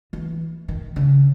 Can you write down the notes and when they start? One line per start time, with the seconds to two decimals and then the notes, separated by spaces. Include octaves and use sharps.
0.13 E3
0.68 D#3
0.96 C#3